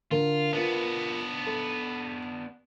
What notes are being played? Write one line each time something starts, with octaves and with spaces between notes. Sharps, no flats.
D3 F4 A#4
B3 D4 F4 A#4 B4
A4